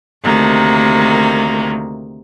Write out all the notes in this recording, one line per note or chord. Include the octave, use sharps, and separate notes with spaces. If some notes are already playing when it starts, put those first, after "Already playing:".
D2 C3 D#3 A#3